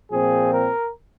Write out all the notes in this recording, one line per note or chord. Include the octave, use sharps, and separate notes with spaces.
A#2 F3 C4 G#4
A#4